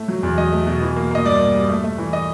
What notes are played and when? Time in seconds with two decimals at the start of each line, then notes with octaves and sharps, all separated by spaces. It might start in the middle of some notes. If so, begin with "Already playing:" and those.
Already playing: A2 A3
0.08 F#3
0.23 E2
0.38 F#3 D#5
0.52 A3
0.67 B2
0.82 E3
0.96 A#3
1.11 A#3 D#5
1.25 G2 D5
1.40 A#3
1.54 G3
1.69 A3
1.84 A3
1.98 E3
2.13 D#5